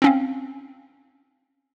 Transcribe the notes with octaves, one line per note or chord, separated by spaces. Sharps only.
C4 C#4 F5